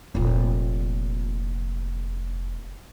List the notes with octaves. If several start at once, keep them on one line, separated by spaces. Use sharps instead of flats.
F1 A#2